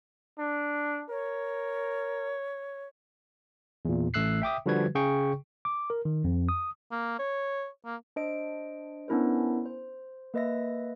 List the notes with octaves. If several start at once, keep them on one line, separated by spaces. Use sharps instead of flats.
D4
A#4 C#5
E2 A#2
A1 A3 E6 F#6 C7
E5 G5 D6 D#6
D3 F3 G3 F#4 B4 G#6
C#3 G#4 G5 C#6
D6
A#4
D#3
F2
D#6
A#3
C#5
A#3
D4 C5 D#5 D7
B3 C#4 D4 E4 A#4 C5
C5
A#3 B4 D#5 E5 A#6